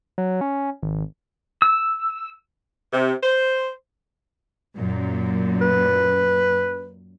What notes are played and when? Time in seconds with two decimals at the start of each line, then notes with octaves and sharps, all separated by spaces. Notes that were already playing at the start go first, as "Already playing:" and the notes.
0.18 F#3
0.41 C#4
0.83 G#1
1.62 E6
2.93 C3
3.23 C5
4.77 F#2 A#2
5.62 B4